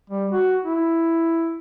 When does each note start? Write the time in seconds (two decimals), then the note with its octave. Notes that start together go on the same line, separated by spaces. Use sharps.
0.10 G3
0.32 F#4
0.64 E4